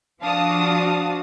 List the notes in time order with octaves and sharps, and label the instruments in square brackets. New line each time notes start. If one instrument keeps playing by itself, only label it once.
[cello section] F3 D4 F#4 [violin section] F5 A5 D#6